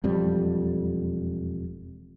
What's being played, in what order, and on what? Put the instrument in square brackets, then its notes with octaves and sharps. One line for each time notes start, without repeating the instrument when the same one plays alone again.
[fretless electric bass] E1 F2 G3